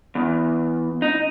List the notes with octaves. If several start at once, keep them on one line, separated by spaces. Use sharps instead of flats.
E2
D#4